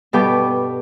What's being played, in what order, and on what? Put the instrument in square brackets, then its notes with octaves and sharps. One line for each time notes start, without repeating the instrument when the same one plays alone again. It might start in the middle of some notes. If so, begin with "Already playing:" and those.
[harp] G2 B2 B3 A4 G5 D6